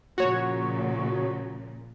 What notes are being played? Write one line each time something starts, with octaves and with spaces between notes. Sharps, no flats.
A#2 C#3 F3 F#4 C#5